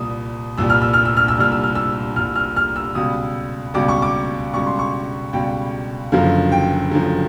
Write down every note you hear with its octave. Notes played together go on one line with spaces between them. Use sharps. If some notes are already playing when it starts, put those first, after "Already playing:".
Already playing: C2 A#2 G3 D#6
C2 A#2 G3 E6
F6
E6
F6
E6
F6
E6
C2 A#2 G3 F6
E6
F6
E6
C2 A#2 G3 F6
F6
F6
E6
C#2 B2 G3 D#6
C#2 B2 G3 D6
C#6
D6
C#2 B2 G3 C#6
C6
C#6
C#2 B2 G3 G5
F#1 F#2 D3 F3 F5
G5
F#1 F#2 D3 F3